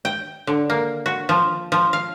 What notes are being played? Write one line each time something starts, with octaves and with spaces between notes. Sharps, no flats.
G5
D3
A#3
F#4
F3
F3
F5